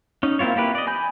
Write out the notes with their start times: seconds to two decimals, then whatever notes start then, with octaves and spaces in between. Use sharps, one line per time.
0.23 C#4 D#4
0.39 A#3 C4 E4 F4 C#5
0.56 A#3 E4 G4 B4
0.75 D5 D#5
0.87 G#5 B5 G6